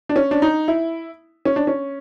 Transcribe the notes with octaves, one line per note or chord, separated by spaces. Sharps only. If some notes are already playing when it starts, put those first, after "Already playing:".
D4
C#4
D4
D#4
E4
C#4
D4
C#4